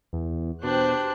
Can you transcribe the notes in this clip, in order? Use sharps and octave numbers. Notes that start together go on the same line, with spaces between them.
E2
B2 D4 G4 C5 F#6